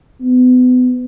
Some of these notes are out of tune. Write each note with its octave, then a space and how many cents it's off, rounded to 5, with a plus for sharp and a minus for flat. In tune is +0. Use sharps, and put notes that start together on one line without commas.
B3 +30